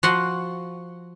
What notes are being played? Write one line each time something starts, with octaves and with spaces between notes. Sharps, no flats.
F3 F4 F#4 F#5 C6